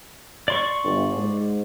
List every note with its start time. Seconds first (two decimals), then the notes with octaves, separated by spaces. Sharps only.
0.48 D5 C6 C#6
0.84 G1
1.16 G#2